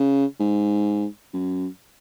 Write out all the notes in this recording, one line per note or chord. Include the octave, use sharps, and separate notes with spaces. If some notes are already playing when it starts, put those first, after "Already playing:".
Already playing: C#3
G#2
F#2